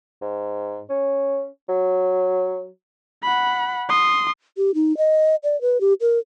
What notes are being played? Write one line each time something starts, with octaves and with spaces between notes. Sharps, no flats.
G#2
C#4
F#3
F#5 B5
C6 D#6
G4
D#4
D#5
D5
B4
G4
A#4